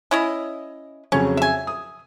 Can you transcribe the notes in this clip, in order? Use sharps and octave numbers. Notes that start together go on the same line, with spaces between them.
C#4 E4 D#5
F2 C#3 F#3 C#4
E5 G#5
D#6